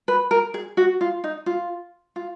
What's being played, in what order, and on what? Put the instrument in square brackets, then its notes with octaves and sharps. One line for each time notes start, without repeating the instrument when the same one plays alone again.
[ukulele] B4
A#4
G#4
F#4
F4
D#4
F4
F4